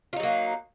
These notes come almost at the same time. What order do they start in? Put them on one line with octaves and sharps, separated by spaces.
F4 D#4 F#3 A#3